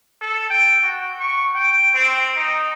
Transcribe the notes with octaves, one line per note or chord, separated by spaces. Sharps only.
A4
G5
F#4
C#6
G5
C4
D#4